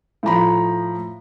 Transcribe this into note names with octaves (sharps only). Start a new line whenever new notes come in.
A2 F3 A#5 B5